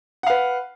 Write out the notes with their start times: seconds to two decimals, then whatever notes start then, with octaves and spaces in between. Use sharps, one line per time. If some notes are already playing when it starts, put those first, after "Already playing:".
0.23 F#5
0.27 F5
0.30 B4